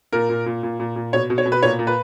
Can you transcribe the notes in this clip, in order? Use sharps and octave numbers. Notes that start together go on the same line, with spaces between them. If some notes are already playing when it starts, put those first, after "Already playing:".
A#2 A#4
A#2
A#2
A#2
A#2
A#2
B2 C#5
B2
C#5
B2
B4
A#2 C#5
A#2
B4